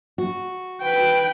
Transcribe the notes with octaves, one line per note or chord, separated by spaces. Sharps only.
F#4
B4 G5